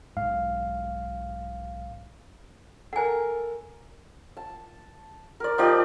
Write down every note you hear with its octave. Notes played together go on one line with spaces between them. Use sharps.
B1 G#2 F5
A4 A#4 F#5 G#5
A5
A#4 D5
F3 D#4 G4 D5